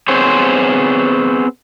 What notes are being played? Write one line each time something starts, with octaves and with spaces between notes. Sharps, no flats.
B3 C4 G#4 C5 C#5